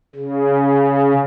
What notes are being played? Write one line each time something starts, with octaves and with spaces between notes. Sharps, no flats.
C#3